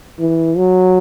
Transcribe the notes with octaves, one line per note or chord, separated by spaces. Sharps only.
E3
F#3